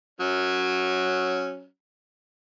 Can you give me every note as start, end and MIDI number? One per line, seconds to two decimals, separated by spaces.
0.20 1.65 54
0.20 1.65 61